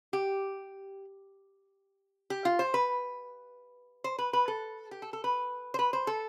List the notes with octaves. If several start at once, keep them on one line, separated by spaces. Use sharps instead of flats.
G4
G4
F4
C5
B4
C5
B4
B4
A4
G4
A4
A4
B4
C5
B4
C5
A4